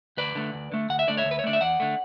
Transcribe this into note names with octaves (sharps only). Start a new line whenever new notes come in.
D2 B4 D5
D3 A3
D2
D3 A3
D2 F#5
E5
D3 A3 D5
C#5 E5
D2
B4
C#5
D3 A3 D5
E5
E2 D5 F#5
D3 A3